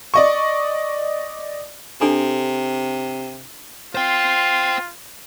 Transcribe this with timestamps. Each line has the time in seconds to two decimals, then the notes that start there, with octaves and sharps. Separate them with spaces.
0.14 D5 D#5 C#6
2.01 C3 D4 A4 G#5
3.95 F4 C5 G5